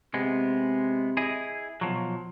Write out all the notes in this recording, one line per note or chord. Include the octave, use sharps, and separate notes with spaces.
C3 G#3 B3
E4 G#4 D#5
B2 F3 F#3